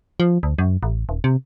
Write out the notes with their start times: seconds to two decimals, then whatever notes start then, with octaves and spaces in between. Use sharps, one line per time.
0.20 F3
0.43 D2
0.59 F#2
0.83 A1
1.09 D#1
1.24 C3